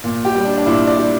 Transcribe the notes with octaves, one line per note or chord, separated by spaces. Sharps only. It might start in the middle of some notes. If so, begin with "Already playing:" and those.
A#2
G4
G3
D4
D4
A#2 E4
D5
G3